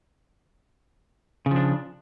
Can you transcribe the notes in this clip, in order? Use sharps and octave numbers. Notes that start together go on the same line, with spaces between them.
C#3 F3 D4